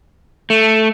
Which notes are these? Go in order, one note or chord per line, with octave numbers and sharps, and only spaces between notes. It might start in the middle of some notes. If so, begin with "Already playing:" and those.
A3